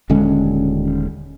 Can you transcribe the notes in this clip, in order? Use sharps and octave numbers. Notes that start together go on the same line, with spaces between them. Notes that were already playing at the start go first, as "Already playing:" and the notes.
D#1 D3 G#3 C#4